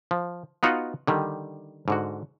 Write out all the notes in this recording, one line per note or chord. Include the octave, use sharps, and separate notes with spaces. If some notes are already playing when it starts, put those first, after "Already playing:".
F3
B3 D#4 F4 F#4 D#5 F#5
D3 D#3 G3
G#2 D3 F#4